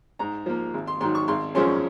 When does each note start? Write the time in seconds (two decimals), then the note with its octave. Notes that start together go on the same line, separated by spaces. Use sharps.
0.19 G#2 A#5
0.46 F3 A#3
0.74 G#1
0.87 C6
1.01 G#2 D#3 F#3 C6
1.15 C#6
1.28 G#1 C6
1.55 F#2 F3 G#3 C#4 C6